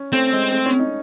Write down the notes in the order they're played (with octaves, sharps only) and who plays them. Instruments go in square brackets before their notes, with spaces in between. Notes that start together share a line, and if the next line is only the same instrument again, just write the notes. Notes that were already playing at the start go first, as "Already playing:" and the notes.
Already playing: [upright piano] C#4
[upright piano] A3 [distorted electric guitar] C4
[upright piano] G#3
A3
C#4
D#4